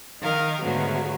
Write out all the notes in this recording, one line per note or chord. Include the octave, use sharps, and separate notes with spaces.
D#3 D#4 A#4 F5
G#2 B2 D3 F#3 A3